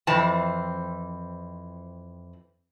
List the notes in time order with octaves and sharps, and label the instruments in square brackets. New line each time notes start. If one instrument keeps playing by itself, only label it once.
[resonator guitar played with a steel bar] F2 E3 C4 A5